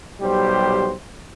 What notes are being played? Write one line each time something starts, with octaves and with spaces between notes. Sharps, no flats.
B1 G3 G4 C5